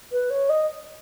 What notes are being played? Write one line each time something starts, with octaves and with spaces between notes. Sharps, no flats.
B4
C#5
D#5